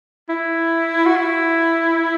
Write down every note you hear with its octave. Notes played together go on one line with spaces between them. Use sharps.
E4
F#4
E4